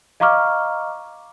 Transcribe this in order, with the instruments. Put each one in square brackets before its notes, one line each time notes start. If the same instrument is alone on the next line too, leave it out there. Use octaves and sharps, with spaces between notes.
[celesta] D#5 F5 A#5 C#6 D6 F6